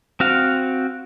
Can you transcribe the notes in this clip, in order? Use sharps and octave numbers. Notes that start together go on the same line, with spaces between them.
C4 F#4 F5